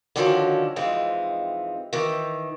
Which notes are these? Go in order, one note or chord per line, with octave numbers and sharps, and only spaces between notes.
D3 D#3 F3 F#3 C#4 D4
F2 E3 G#3 C4 D#4
D#3 E3